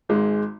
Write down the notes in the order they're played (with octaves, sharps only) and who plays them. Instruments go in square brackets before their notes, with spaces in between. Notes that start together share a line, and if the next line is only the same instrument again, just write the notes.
[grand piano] G#1 G#2 G#3